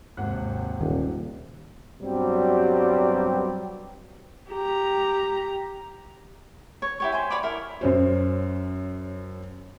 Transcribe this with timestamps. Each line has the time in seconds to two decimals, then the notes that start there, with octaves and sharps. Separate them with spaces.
0.17 G#1 D#2 C3 F#5 F#6
0.81 D#1 D#3
2.02 G2 B2 F#3 G3 C4 G4
4.50 G4 A#5
6.82 C#5
7.00 E4 G4 C#5
7.12 C5 G#5
7.30 C#5 D5 B5 D6
7.43 E4 A#4
7.81 F#2 C#4 C5